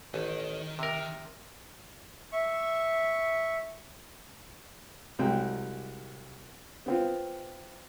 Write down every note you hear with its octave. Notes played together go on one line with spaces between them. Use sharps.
A1 D#3
C3 A#4
E5 C#6
C2 F#3 G#3 G5
B3 C4 F4